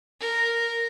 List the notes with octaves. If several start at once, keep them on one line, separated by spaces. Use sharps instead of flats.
A#4